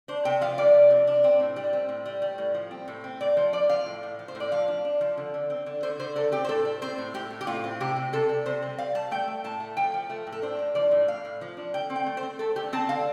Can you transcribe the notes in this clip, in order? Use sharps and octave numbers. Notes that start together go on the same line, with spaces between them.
D4 C5
C3 G5
F3 F5
C3 D5
F3
C3
D4
C4
A2
G3
C4
A2
G3
G3
A2
F3
C4
A2
C4
A2 D5
F3 C5
F3 D5
F3 F5
A2
A2
F3
C5
A2
D5
F3 F5
D4
D4
F3
D3
D3
C4
D3
D3 C5
D3 C5
D3 A4
C4 G4
C5
A2 A4
G3
C4 C5
A2
A2 G4
A2
G4
A2 F4
C4
C3 G4
C3
C3 A4
G3
C3 C5
C4
G3 F5
G3 A5
A3 G5
A3
A2 A5
A3
F3 G5
F3
A3
A2
A4
D4 C5
A2
F3 D5
A2
A2 F5
A2
F3
D4
D3 G5
C4
G5
A3
C5
C4
A3 A4
D3 G4
C4 A5
D3 F5